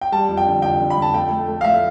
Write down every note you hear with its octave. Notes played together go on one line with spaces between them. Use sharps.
G5
G3 A5
F2
G5
D3
F2 G5
D3
B5
F2 A5
A3 G5
A3
A3
F5
A3 E5